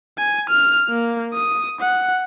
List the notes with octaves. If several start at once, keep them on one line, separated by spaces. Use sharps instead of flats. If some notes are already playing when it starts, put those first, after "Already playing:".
G#5
F6
A#3
D#6
F#5